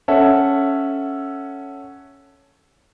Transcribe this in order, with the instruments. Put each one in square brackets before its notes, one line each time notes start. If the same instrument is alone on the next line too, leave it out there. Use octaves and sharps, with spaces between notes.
[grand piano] C#4 A4 E5 F#5